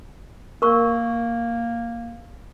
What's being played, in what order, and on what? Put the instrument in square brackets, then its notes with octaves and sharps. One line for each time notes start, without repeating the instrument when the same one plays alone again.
[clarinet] A#3 [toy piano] A#4 C#6